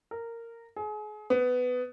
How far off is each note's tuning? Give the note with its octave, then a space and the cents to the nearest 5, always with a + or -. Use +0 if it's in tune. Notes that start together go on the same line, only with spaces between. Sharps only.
A#4 -15
G#4 +35
B3 +15